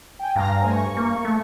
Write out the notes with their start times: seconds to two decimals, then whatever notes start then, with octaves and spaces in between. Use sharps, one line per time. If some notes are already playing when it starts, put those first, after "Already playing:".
0.19 G5 G#5
0.36 G2 F5 A#5 A#6
0.61 A3 C5 G#5
0.73 C#6
0.97 A#3
1.25 A3